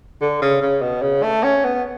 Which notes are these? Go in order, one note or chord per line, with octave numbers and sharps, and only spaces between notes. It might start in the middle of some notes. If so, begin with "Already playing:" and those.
D3
C#3
C#3
B2
C#3
A3
C#4
B3